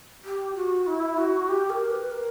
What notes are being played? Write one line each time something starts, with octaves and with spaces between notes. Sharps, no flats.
G4
F#4
E4
F#4
G4
A#4
B4
A#4